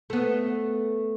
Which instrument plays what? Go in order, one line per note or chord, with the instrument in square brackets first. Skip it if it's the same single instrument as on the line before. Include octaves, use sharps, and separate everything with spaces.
[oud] A3 B3